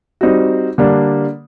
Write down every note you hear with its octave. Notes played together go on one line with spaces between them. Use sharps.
G3 C4 D#4 F#4
D3 G3 A#3 D4